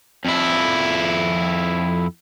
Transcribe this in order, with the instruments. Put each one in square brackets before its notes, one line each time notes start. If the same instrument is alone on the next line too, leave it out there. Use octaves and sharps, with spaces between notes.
[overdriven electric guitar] F2 E4